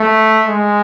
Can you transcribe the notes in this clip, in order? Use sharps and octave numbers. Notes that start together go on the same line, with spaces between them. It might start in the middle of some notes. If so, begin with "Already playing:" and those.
Already playing: A3
G#3